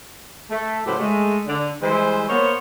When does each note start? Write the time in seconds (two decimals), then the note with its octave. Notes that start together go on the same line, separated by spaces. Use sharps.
0.51 A3
0.86 A2 C#3 F#3 G4 B4 C5
1.00 G#3 A3
1.47 D3
1.82 E3 G3 G#3 C5
2.28 A#3 B3 C5 C#5